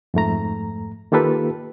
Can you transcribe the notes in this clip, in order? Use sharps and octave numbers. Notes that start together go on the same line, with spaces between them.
F2 G#2 A3 A#5
D#3 A#3 F4 G4 A4 B4